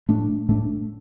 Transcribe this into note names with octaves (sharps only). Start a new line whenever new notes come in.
A2 A3 D4
A2 A3 D4